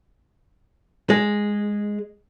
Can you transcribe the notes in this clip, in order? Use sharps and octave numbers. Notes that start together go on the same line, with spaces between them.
G#3